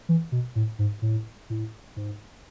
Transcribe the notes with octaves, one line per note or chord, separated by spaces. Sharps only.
E3
B2
A2
G#2
A2
A2
G#2